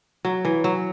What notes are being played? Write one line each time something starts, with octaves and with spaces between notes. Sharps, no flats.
F#3
E3
F#3